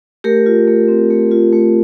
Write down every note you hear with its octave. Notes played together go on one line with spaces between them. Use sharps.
A3 G4 A#4
F4
A3
C4
A3
F4
A3